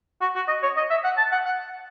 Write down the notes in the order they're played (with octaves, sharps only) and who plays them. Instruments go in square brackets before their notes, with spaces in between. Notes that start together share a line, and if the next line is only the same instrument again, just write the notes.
[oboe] F#4
F#4
D#5
C#5
D#5
E5
F#5
A5
F#5
F#5